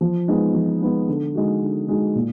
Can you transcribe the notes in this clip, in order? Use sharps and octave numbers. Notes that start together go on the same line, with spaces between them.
F3
G#3 B3 D#4
F3
G#3 B3 D#4
D3
G#3 D#4 F#4
D3
G#3 D#4 F#4
A#2